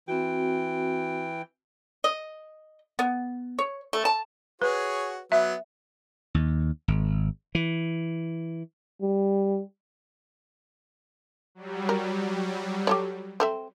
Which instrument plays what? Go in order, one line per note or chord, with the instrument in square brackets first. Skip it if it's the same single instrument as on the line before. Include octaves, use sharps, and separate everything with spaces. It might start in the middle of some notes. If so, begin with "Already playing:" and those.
[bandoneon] E3 G5 [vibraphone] C4 F#4
[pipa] D#5
B3
C#5
A3
A5
[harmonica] F#4 G#4 C#5 [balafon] B4
[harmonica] F#3 B3 [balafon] E5
[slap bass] D#2
G#1
E3
[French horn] G3
[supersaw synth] F#3 G3
[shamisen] A#4
G4 A4 C#5
C4 A4 E5